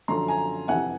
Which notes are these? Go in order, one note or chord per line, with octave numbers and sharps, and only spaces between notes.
F#2 D3 F3 A#5 C6
G#5 A#5
F2 C3 E3 F#5 G#5